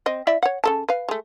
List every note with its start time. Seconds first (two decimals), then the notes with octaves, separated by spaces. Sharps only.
0.06 C4 D#5
0.27 E4 D5 E5
0.43 C#5 F#5
0.64 C#3 A4 A5
0.89 B4 F5
1.08 G#3 A3